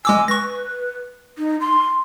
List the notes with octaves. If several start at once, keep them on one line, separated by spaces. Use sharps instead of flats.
G#3 G#5 D6 E6
B4 C#6 A#6
D#4
C6